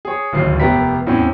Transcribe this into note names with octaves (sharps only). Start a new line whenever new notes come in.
G#4 C#5
D1 G1 D#2 C7
F1 B3 G4 A#4 E5 B6
E2 A2 C4 C#4